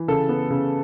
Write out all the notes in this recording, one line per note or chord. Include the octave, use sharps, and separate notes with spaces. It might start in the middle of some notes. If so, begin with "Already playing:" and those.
Already playing: E3
C#3 A4
B3
C#3